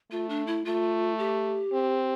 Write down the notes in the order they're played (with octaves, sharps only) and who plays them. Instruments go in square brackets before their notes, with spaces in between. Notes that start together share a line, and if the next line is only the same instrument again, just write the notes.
[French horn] A3 [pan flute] F4
[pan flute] D4
E4
[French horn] A3 [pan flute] F4
[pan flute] G4
[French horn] C4